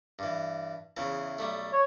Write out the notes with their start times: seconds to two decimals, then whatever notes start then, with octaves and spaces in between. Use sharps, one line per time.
0.19 G2 E3
0.97 E2 C#3 E3
1.39 B1 G3 A3
1.73 C#5